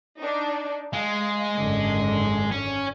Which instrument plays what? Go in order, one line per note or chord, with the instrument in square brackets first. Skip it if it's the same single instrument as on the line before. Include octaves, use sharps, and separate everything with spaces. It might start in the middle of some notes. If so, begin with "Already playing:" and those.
[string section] D4 D#4
[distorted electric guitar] G#3 [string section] F5
[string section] G#1 F#2 D3
[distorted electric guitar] C#4